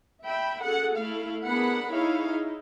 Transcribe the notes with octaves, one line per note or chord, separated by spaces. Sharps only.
E5 G5 B5
C#4 F#4 G#4 A4 F#5
A3 E4 F5
B3 D4 G#4 A#4 F#5 B5
D#4 E4 G#4 C#5 F5
D#4 E4